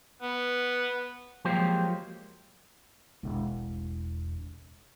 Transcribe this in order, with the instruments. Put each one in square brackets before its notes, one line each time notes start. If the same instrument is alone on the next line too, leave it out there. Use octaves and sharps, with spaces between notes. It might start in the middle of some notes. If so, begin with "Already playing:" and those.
[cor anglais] B3
[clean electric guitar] F3 F#3 G#3 A#3 G4 C5
[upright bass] E1 A1